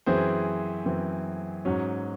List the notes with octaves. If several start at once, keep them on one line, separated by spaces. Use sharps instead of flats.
F#2 E3 C4 G#4 C5
F#2 E3 C4
G#2 F#3 C#4